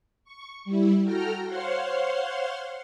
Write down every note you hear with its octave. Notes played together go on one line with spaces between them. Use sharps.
C#6
G3 E4
F#4 A4 G5 A#5 F6
C5 C#5 F5 F#5 C6